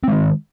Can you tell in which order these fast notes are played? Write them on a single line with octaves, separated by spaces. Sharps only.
C4 G#3 D#3